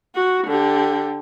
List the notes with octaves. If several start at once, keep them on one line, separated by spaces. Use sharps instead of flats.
F#4
D3 G4